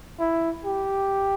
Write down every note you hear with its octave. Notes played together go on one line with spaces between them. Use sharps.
E4
G4